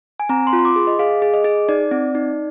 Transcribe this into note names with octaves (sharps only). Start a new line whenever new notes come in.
G#5
C4 A#5
C6
F4
C6
D6
G#4
D#5
G#4 F5
G#4
D#5
G#4
D#4 D5
C4
D#4